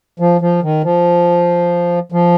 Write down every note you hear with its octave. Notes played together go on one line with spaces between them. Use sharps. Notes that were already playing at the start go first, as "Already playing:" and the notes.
F3
F3
D#3
F3
F3